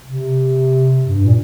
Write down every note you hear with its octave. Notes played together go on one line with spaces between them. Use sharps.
C3
G2
A#2